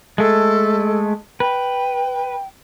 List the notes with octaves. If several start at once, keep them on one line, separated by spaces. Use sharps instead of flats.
G#3 A3 A4
B4 G5